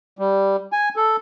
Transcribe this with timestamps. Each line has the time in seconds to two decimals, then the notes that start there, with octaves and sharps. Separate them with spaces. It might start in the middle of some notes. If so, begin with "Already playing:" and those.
0.19 G3
0.72 G#5
0.96 A4